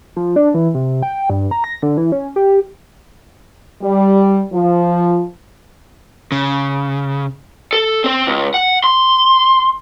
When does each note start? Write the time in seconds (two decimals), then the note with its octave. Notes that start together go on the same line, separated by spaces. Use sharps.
0.16 F3
0.36 D4
0.54 E3
0.74 C3
1.02 G5
1.30 G2
1.51 A#5
1.64 A#6
1.82 D3
1.97 E3
2.12 C#4
2.36 G4
3.82 G3
4.53 F3
6.32 C#3
7.73 A4
8.04 C4 C5
8.27 C#2
8.54 F#5
8.84 C6